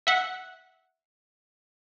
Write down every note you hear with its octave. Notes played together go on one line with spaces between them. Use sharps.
E5 F#5